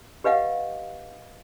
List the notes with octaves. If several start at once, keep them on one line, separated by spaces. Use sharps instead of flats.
G4 B4 D#5 F5 F#5